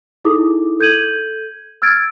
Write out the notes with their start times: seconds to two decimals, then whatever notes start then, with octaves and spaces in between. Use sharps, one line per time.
0.25 D#4 E4 G#4 A4 D6 D#6
0.80 A4 G6 G#6 D#7 F#7
1.82 E6 F6 G#6 A6 D7